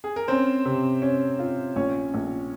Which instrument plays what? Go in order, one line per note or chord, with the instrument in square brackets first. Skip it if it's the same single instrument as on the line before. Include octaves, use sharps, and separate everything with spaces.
[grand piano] G#4
A#4
[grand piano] C4 C5 [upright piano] C#4
[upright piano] C3
C#4
F4
[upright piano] A#1 [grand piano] C#4 C#5
[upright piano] A#1